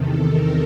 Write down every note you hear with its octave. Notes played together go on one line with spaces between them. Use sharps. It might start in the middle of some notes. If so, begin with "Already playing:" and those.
Already playing: E2 C3 D#3 A4
A#4